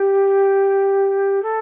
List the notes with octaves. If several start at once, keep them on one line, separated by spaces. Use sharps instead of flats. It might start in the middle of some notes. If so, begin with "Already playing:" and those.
Already playing: G4
A4